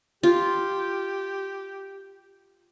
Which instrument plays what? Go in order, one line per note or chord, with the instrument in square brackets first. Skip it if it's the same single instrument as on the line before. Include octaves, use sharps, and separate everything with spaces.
[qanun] F4 [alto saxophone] G4